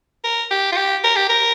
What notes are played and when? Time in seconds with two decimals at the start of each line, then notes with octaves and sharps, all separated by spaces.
0.24 A#4
0.51 G4
0.72 F4
0.77 G4
1.04 A#4
1.16 G4
1.29 A#4